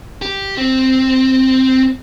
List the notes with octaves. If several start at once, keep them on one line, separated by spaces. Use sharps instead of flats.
G4
C4